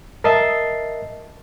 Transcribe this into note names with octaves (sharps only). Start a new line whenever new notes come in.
A#4 D#5 E5 A5 C7